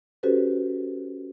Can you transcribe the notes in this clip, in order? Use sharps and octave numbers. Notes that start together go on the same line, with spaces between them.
C#4 F#4 G4 A4 B4 C5